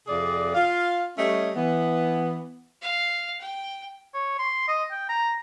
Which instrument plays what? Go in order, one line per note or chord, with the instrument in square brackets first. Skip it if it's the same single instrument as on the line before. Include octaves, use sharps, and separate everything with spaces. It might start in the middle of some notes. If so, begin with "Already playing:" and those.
[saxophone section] F2 C3 G#4 D5
F4 F5
G3 A3 C#4 C#5 D#5
E3 B3
[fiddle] F5
G5
[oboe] C#5
C6
D#5
G5
A#5